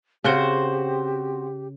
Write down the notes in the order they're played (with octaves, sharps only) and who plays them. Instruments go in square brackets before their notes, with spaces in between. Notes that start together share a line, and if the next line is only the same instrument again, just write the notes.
[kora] C#3 [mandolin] C4 F#4 C5 [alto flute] G4